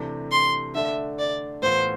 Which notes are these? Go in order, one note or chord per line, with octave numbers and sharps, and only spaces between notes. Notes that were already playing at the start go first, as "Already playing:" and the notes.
Already playing: C3 E3 A3 D4 G4
C6
D3 A3 D4 E5
D5
A2 E3 B3 F4 C5